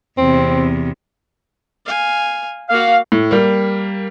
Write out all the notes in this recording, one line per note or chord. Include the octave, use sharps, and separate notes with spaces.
E2 C3 C4
F5 G#5
A#3 F#4 F5
A2
G3 A#3